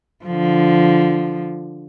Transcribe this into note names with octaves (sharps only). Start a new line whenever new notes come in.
D3 F3